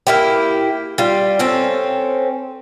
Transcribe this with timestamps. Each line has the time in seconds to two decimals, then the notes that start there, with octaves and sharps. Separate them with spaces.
0.07 A#3 E4 G4
0.98 G3 F4
1.39 C4 C#4 A4